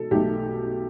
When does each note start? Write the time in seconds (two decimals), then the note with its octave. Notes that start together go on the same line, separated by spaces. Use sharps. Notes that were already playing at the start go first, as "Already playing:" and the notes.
Already playing: B2 A4
0.11 B1 B2 A3 G4